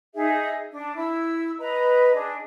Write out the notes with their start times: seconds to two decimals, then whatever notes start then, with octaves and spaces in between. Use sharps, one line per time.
0.15 D#4 G#4 E5
0.72 D4
0.95 E4 E6
1.59 B4 D#5 A#5
2.13 D4 G#4 D#5